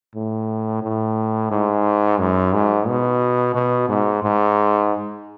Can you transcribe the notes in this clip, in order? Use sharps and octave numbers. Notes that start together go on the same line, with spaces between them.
A2
A2
G#2
F#2
G#2
B2
B2
G#2
G#2